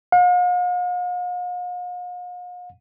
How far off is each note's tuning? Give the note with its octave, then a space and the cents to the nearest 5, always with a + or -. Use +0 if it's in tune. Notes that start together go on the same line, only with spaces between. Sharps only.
F5 +45